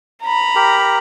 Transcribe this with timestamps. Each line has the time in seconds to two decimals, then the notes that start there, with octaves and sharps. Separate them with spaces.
0.24 A#5 B5
0.56 G4 A#4